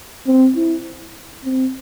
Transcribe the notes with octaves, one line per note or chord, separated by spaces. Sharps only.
C4
E4
C4